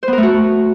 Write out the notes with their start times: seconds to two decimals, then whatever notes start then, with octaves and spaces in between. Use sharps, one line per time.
0.03 C5
0.08 B3
0.13 A#4
0.18 A3
0.23 F#4